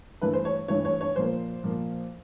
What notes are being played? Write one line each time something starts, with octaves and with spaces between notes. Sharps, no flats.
G2 E3 A3 B4
C5
C#5
G2 E3 A3 C#5
C#5
C#5
A#2 F3 A#3 C5
A#2 F3 A#3